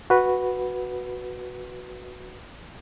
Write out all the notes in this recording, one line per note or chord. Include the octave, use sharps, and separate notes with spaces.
F#4 B4